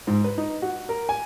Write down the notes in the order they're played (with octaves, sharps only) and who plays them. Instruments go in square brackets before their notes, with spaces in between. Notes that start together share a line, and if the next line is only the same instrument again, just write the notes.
[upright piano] G#2
B4
D#4
F#4
A#4
G#5